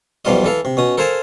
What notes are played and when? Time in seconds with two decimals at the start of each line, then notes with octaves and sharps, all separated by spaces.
0.25 B1 E2 F3 G3 F4 D#5
0.44 E3 A4 F5
0.65 C3
0.77 B2 C#4 D#6
0.98 A4 A#4 C5 F5 G#5 A5